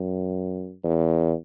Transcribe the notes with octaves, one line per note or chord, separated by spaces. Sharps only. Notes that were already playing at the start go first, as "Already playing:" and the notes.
Already playing: F#2
E2